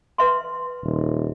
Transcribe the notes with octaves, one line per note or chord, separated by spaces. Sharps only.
B4 E5 C6
D#1